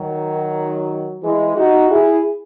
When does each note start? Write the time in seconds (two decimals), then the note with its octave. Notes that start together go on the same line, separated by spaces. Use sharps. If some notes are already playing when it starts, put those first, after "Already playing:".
Already playing: D#3 F#3
1.24 E3 G#3
1.56 D#4 F#4
1.90 E4 G#4